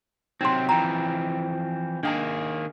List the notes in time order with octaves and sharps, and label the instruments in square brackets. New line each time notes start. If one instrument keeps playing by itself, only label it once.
[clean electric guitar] C3 F#3 C4 [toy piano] D#4 C6
[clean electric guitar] E3 F3 C4 [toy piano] G5 A#5
[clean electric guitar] D#3 A#3 G#4 [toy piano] D4 G5 A5